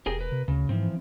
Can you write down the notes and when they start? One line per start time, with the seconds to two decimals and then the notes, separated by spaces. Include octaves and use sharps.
0.06 E1 G4 G#4 A#4
0.19 A#4 B4
0.32 C3
0.48 D2 C#3
0.69 G#2 E3 F3 C4